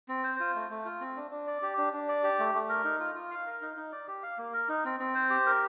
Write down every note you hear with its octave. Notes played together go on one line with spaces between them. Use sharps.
C4
C5
F4
A3
A3
F4
C4
D4
D4
D5
G4
D4
D4
D5
G4
A3
A3
A#4
D#4
F4
F4
F5
A#4
D#4
D#4
D5
G4
F5
A#3
A#4
D#4
C4
C4
C5
G4
A#4